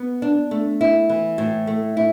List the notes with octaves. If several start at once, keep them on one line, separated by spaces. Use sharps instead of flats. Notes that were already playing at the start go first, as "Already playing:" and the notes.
Already playing: B3
D4
A3
E4
E3
A2
A3
E4